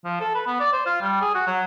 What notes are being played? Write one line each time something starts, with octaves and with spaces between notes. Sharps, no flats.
F3
A4
B4
B3
D5
C5
F4
G3
G#4
F#4
F#3